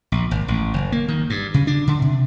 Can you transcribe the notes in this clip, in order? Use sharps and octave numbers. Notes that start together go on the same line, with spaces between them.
A#1
G#1
A1
F#1
A#3
D#3
G2
C#3
D4
D3
C3